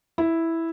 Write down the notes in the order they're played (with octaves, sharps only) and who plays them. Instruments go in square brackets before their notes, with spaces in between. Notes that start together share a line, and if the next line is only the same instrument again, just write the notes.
[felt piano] E4